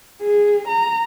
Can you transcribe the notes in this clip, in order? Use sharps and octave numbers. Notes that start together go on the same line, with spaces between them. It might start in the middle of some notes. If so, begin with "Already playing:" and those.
G#4
A#5